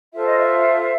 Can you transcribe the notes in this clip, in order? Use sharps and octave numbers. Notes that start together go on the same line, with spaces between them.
F4 A4 C5 E5
D#5
E5